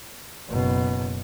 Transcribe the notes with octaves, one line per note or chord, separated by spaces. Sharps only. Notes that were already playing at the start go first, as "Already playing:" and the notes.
F#1 B2